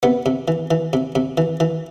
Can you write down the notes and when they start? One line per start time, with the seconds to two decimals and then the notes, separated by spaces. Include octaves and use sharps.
0.03 C3 B3
0.26 C3
0.48 E3
0.71 E3
0.93 C3
1.15 C3
1.38 E3
1.60 E3